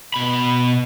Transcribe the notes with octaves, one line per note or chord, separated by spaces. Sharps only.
B2 B5